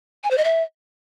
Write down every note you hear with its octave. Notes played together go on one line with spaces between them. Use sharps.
G#5
C5
D#5
E5